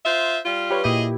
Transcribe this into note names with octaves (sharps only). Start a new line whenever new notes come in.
F4 C5 E5
G3 F4
G4 B4 C#5
A#2 E4 G4 G#4 D#5